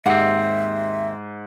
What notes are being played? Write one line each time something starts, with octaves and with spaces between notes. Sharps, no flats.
D#2 G#2 C4 G4 D#5 E5 F#5